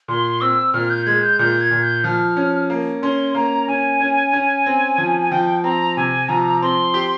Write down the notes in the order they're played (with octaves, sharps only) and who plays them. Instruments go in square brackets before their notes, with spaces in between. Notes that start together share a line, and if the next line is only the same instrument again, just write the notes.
[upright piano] A#2 [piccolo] C6
[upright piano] C4 [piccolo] E6
[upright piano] A#2 [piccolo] F6
[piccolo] G6
[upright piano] G#3 [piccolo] G#6
[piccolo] G6
[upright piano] A#2 [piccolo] G6
[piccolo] G#6
[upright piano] A#2
[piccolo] G6
[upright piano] F3 [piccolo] F6
[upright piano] C#4
A#3
[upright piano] C#4 [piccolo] C6
[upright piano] A#3 [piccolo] A#5
[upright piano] C#4 [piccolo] G#5
[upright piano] C#4
C#4
C4
F3
[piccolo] G#5
[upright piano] F3 [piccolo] G5
[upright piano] C4 [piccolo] A#5
[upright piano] C3 [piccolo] G#5
[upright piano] F3 [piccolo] A#5
[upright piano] C4 [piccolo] C6
[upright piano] G4